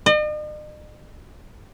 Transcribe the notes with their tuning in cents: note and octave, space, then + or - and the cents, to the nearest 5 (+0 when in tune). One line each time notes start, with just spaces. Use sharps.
D#5 -45